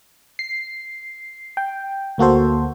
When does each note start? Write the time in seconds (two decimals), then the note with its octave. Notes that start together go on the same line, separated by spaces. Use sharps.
0.39 C7
1.57 G5
2.18 D2 A#3 F#4 A4 C5